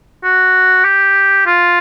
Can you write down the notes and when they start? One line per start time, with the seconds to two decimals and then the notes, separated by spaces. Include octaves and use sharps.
0.24 F#4
0.84 G4
1.46 F4